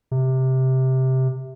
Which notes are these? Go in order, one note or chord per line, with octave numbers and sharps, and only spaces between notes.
C3